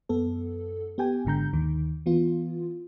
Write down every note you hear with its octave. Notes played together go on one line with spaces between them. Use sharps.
F#2 B3 A4
B3 G4 G5 G#5
G#1 G#2 D3 A#5 G6
D#2 D#3
E3 B3 F4